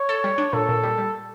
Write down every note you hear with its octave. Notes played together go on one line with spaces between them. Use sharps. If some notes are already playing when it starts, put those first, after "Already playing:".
Already playing: C#5
A4
G3
D4
A#2 A4
A#2
G3
G3